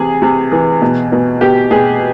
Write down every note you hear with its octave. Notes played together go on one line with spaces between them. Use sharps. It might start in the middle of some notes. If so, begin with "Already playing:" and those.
Already playing: C3 E3 G#4
C3
E3
B2
B2
B2 G4
B2 G#4